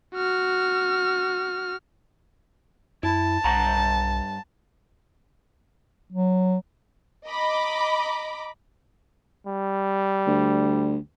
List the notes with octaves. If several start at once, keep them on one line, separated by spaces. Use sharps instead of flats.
F#4 F6
F#2 E4 A5
B1 G2 F#5 A#5
F#3
D#5 A#5 B5 D6
G3
D2